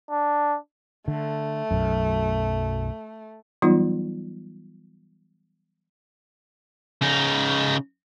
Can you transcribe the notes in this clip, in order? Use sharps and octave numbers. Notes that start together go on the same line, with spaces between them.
D4
D3 A3
B1 F#2
E3 F#3 G3 B3 D#4 F4
C#3 D#4